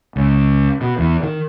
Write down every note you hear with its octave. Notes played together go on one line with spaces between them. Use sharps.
C#2
B2
E2
D#3